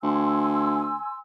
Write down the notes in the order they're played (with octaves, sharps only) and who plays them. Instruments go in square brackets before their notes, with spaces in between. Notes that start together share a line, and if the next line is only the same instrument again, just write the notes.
[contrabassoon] D2 [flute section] G#5 C6 E6